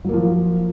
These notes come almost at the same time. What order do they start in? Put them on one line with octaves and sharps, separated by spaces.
F#3 A#3 F3